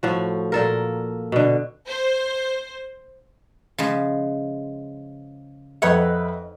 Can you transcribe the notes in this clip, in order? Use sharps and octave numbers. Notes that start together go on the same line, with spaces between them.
A2 F3 F#4
A#2 A4 A#4
B2 D3
C5
C#3 F3 G#3
F2 D#4 B4 C#5 E5 F#5